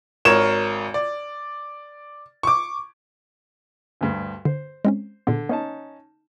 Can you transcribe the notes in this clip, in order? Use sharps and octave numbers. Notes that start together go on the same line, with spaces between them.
G#1 A#4 C#5 E7
D5
C#6 D6
D2 G2
D3 C5
G#3 C4 C#4
A#2 D3 B3
B3 C#4 D#4 A5